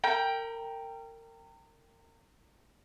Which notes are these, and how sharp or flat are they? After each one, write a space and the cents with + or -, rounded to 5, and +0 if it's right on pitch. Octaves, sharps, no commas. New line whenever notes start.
A#4 -30 G5 +5 A#5 +35